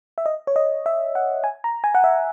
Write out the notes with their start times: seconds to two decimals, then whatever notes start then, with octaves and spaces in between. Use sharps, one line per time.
0.18 E5
0.26 D#5
0.47 C#5
0.56 D#5
0.86 E5
1.15 F#5
1.44 G#5
1.64 A#5
1.84 G#5
1.95 F#5
2.04 E5